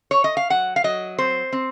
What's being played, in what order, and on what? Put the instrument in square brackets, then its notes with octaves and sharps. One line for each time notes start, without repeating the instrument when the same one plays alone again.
[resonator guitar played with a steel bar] C#5
D#5
F5
F#3 F#5
F5
F#3 D#5
C4 C5
C4